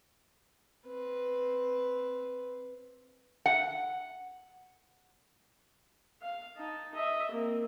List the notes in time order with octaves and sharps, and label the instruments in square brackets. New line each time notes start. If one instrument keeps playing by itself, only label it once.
[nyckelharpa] C4 B4
[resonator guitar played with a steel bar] F#5
[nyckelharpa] F5
D#4 A5
D#5 E5
A#3 C4